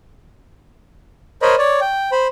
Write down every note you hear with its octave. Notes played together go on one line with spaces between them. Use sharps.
A#4 C5 C#5 D#5 B5
C#5 D5
G5
C5 B5